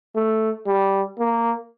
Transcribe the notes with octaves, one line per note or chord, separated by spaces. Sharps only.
A3
G3
A#3